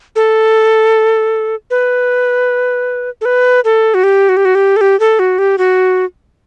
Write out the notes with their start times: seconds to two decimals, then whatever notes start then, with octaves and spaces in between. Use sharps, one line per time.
0.16 A4
1.70 B4
3.21 A4
3.25 B4
3.65 A4
3.94 F#4
4.04 G4
4.29 F#4
4.37 G4
4.45 F#4
4.55 G4
4.76 A4
4.81 G4
5.00 A4
5.19 F#4
5.39 G4
5.58 F#4